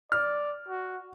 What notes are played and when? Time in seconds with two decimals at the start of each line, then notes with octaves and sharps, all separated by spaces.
0.12 D5 F6
0.68 F#4